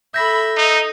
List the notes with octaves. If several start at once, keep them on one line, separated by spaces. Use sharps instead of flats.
A4 E5 B5 G6 A#6 B6
D#4 D#5